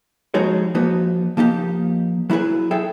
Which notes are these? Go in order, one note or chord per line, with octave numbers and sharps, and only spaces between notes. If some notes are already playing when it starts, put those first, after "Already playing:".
F3 G#3 D#4 F#4 G#4 C#5
F3 A#3 D#4 F#4 B4
F3 A#3 D#4 G4
F#3 E4 F#4 G#4 B4
G#4 A4 E5 G5